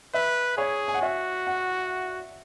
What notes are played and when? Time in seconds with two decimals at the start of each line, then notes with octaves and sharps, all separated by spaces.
0.14 B4 E5
0.57 G#4 C#5
0.88 G#5
0.94 F#5
1.02 F#4 E5
1.47 F#5